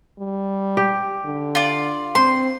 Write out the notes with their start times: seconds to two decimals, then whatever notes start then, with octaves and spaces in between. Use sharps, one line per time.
0.19 G3
0.77 G4
1.25 D3
1.55 F4 D5
2.15 C4 C5 C6